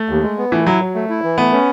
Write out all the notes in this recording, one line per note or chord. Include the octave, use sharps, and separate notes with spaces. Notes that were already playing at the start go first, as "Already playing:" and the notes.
Already playing: A3
D#2
G#3
B3
E3 A3
F#3 E4
F#3
A3
E4
E3
A3 B3
C#4